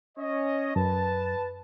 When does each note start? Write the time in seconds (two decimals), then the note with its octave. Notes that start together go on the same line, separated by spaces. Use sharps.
0.18 C#4 C#5 D#5
0.76 F#2 B4 A5